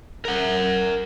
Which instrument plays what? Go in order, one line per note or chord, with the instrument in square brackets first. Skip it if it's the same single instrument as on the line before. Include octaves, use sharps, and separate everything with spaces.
[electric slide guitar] A#4 F#5